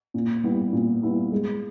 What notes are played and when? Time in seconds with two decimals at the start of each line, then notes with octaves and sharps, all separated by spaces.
0.14 A#2
0.44 G3 B3 E4
0.73 A#2
1.03 G3 B3 E4
1.32 G#3